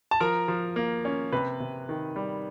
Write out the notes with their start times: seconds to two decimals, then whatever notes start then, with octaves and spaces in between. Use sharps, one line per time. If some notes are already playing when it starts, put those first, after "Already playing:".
0.11 A5
0.20 F3 A#4 A#5
0.48 F3
0.76 A#3
1.05 C#4
1.32 C3 B4 B5
1.60 C3
1.89 D#3
2.16 G3